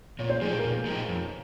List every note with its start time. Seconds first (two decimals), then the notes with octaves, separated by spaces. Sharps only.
0.19 A#2 C#5
0.30 C5
0.41 F3 G#3 D#4 G4 G#4
0.53 G#4
0.59 A#4
0.63 A#2 G#4
0.86 F3 G#3 D#4 G4
1.08 F2